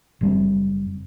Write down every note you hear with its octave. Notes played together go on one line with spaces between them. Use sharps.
F#1 G3 C4